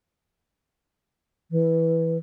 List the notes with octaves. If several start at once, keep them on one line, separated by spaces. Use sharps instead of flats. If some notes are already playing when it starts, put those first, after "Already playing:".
E3